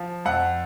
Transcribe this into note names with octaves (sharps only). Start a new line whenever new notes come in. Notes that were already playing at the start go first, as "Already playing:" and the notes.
Already playing: F3
F2 F#5